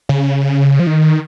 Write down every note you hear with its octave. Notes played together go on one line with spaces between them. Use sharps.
C#3
F3
D#3